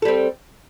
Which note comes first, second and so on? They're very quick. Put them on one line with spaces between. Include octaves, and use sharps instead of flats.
A4 G3 C4